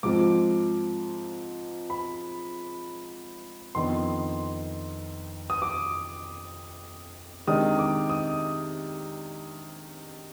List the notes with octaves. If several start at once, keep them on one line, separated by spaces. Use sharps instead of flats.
G#2 F3 C4 D6
B5
F2 D#3 B3 D4 C6
D#6
D6
C3 D#3 G#3 D4 D#6
D6
D#6